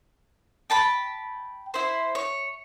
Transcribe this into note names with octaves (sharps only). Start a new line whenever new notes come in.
G5 A5 B5
E4 C5
C#5